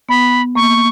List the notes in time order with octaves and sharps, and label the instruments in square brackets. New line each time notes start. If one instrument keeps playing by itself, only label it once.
[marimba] B3 [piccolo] B5
[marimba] A#3 [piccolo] C#6